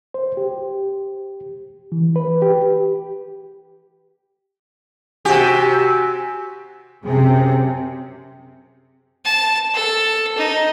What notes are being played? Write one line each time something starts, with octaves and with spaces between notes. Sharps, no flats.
C5
G4
E3
B4
G4
C3 F#4 G4 G#5
F#2 C3 C4 G#4
A5
A4
D#4